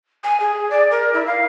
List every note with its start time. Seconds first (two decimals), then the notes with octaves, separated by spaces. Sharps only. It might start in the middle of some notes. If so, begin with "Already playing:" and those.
0.24 G#5
0.40 G#4
0.70 D5
0.91 A#4
1.14 E4
1.26 F5